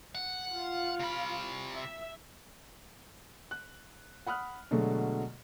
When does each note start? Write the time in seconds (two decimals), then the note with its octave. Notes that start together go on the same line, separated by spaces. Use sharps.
0.15 F#5
0.52 F4 F5
1.00 C3 B5
1.74 E5
3.51 F#6
4.27 F#5 B5 D#6 F6 F#6
4.71 B2 D3 F#3 G#3 A3